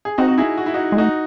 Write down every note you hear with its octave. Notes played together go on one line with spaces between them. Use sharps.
G#4
C4 D#4 F#4
F#4
E4 G#4
F#4
E4
D#4 F#4
G#3
A3 D#4 F#4